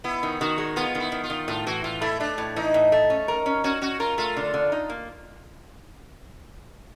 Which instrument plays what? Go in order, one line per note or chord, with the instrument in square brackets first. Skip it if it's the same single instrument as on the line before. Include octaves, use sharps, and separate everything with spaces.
[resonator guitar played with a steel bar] B3 [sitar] E4
[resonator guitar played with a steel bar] D#3
[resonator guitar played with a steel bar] D#3 [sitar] F#4
[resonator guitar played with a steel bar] G#3
[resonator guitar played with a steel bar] B3 [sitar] F4
[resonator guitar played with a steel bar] D#3
[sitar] E4
[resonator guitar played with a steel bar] D#3
[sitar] F4
[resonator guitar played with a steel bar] D#3
[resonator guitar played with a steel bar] A2 [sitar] F4
[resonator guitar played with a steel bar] E3 [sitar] F#4
[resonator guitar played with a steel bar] A2 [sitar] F4
[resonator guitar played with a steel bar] A3 [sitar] E4
[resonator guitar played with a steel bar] A3 [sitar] D4
[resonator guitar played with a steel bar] A2
[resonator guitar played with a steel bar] E3 [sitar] D#4
[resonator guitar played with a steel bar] A2
A3
C#4
A#4
C#4
[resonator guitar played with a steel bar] C#4 [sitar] F#4
[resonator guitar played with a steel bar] C#4 [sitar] F#4
[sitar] F4 [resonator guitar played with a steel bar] A#4
[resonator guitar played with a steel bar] A3 [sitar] F4
[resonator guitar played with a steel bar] D3
D3
D#4
A#3